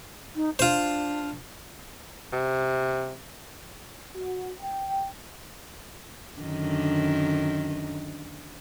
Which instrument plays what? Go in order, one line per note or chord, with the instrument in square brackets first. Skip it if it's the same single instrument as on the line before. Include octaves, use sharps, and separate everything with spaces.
[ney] D#4
[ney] D4 [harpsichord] F4 C5
[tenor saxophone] C3
[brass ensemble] F#4
G5
[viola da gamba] F#2 D3 D#3